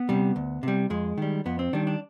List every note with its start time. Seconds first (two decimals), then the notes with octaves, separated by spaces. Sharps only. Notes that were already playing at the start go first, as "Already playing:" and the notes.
Already playing: B3
0.09 C3 G3
0.36 D2
0.63 C3 G3
0.90 F2 G#3
1.18 D#3 G3
1.46 F2 B3
1.59 C4
1.73 D#3 G3 D4
1.87 D4